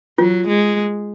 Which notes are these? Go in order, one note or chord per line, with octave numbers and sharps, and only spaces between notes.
F#3 F4
G#3